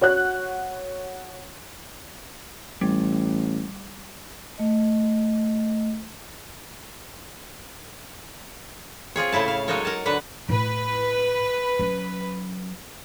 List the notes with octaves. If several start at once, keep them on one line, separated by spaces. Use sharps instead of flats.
F#4 C#5 F#5 F#6
A1 G3
A3 D#5
C4 F4 G#4 C#5
A2 C#3 E4 A5
F5
F#3 G#3 D#4 A4 A#4 C#5
A#4 A5
D3 B4 F#5
A2 E4 B4
F#3 C#4